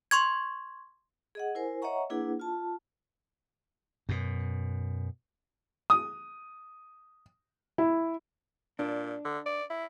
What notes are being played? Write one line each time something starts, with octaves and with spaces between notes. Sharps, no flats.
C6 C#6 G#6
G#4 D#5 F#5
E4 A#4 C5 G#5
C#5 D#5 E5 F#5 A#5 C#6
A#3 D4 E4 G#4 B4 F#5
F4 A5
F#2 B2
D#6
E4
A#2 D4
D3
D5
E4